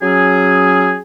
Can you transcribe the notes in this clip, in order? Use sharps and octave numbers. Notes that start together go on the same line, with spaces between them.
F#3 C#4 G#4